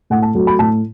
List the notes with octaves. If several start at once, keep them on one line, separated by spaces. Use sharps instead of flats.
A2 F#5
A5
F#3 A3
B5
A2 A5